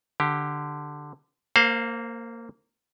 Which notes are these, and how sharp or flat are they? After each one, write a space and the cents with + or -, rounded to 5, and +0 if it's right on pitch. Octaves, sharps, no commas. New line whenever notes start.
D3 +10 G4 +0
A#3 -15 C5 +0 F5 +30